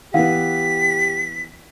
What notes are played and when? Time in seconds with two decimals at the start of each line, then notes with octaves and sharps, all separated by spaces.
0.14 E3 B3 G4 F5 F#5 B6